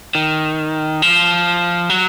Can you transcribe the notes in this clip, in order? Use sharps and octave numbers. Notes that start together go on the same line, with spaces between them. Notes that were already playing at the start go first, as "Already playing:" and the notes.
D#3
F3
F#3